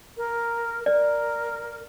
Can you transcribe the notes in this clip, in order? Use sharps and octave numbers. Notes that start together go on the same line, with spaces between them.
A#4
A#4 D5